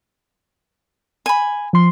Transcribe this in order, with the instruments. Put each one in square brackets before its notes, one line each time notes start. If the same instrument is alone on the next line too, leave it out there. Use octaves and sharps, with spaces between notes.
[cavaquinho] G#5 B5
[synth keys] F3 C6